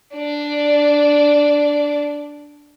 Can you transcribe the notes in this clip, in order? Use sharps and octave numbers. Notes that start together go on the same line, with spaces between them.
D4 D5